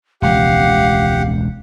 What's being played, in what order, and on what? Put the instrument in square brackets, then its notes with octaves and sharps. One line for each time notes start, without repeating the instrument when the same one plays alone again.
[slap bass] E1 C#2 F3 [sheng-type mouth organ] G4 F#5 [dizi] F5